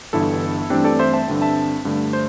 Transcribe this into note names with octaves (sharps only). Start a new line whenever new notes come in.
G1 G2 E3 E4 A4
G2 E3 A3 C4 D4 G4
A4 D5
C5 E5
E5 A5
G2 D3 C4
E5 A5
G2 D3 A3
C5